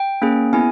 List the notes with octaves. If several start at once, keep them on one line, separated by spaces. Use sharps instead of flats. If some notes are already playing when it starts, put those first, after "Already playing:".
Already playing: G5
A#3 C#4 G#4
B3 E4 G#4 G#5